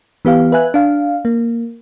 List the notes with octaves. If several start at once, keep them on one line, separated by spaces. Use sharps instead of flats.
E3 B3 G4 F5
B4 E5 G#5 F#6
D4 F5
A#3